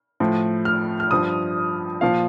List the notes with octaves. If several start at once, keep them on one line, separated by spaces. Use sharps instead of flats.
A2 F3
F6
F6
G2 F3 D#6
A#2 F3 F5